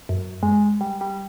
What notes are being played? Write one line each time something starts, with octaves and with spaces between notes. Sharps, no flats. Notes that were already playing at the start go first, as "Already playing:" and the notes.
F#2
G#3
G3
G3